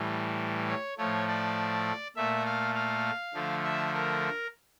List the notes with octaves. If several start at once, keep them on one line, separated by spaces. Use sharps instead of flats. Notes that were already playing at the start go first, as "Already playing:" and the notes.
Already playing: A2 E3 G3
C#5
A2 F3 A3 C#5
D5
A#2 A3 E5
F5
F5
D3 F3 A3
E5
A#4